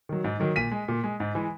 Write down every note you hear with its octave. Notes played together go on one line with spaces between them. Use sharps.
D#3 F#3
G#2
D#3 F#3
A#2 B6 D#7
G#3
A#2
G#3
G#2
E3 G#3